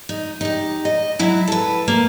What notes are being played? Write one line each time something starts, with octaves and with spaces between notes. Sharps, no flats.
D#4
D#4 G4
D#5
F#3 E4 F#4
A4 B4
A#3